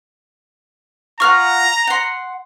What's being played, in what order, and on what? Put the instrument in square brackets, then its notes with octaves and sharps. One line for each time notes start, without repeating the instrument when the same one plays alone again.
[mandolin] F4 F5 F#5 [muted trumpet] A#5 [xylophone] C#6 F6
[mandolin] F#5 C6